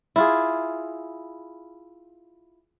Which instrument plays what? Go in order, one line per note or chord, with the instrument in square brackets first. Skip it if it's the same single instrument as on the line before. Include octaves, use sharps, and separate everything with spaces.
[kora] E4 F4 G#4